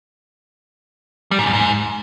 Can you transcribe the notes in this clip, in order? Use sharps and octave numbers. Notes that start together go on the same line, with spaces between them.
G3
G#2
E2
G#2